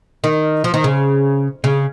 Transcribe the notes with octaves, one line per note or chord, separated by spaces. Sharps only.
D#3
F3
D#3
C#3
C#3